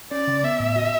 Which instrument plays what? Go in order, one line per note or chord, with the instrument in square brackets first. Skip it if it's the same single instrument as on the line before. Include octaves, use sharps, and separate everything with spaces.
[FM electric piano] C#4 [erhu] D5
[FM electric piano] C#3
[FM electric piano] B3 [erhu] E5
[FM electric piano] A2
F#4